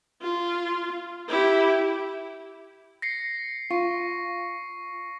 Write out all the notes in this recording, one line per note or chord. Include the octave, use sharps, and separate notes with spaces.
F4
E4 G4
A#6 C7 C#7
F4 C#6